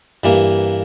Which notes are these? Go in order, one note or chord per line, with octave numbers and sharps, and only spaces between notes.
G2 E3 A#3